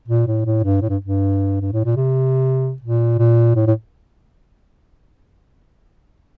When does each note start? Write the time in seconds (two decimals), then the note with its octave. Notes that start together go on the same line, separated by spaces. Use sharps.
0.09 A#2
0.27 A2
0.46 A2
0.63 G2
0.82 A2
0.89 G2
1.05 G2
1.61 G2
1.73 A2
1.85 A#2
1.97 C3
2.82 A#2
3.19 A#2
3.56 A2
3.67 A2